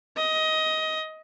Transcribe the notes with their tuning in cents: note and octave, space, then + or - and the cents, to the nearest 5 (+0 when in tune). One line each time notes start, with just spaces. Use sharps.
D#5 +20